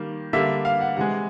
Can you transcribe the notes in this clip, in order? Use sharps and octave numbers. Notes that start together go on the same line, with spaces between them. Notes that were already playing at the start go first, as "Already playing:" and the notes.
Already playing: D#3 G3 A#3
D3 G3 A#3 E5
F5
F#5
C3 E3 G#3 F#5